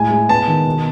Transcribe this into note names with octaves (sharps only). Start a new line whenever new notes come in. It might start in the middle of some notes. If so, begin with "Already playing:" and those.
Already playing: A2 G#3 G#5
G#3
B3 A5
D#3
B2